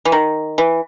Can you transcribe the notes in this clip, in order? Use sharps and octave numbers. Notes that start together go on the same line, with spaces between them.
E3
D#3
E3